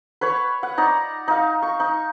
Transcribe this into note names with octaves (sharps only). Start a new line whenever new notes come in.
B4 C#5 B5 C#6
F#5
D#4 D5 A#5
D#4 F5
C#6
D#4